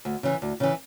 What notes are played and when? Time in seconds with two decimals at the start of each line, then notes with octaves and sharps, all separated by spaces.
0.05 D2
0.23 C#3 E3
0.42 D2
0.60 C#3 E3